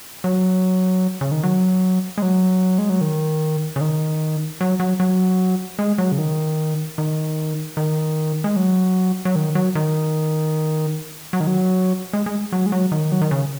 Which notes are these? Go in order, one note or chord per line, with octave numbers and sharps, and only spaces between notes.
F#3
C#3
D#3
F#3
G#3
F#3
G#3
F#3
D#3
C#3
D#3
F#3
F#3
F#3
G#3
F#3
C#3
D#3
D#3
D#3
G#3
F#3
F#3
D#3
F#3
D#3
F#3
D#3
F#3
G#3
G#3
F#3
G#3
F#3
D#3
F#3
D#3
C#3